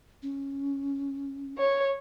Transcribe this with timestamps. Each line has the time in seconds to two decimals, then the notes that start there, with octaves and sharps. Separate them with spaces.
0.23 C#4
1.58 C#5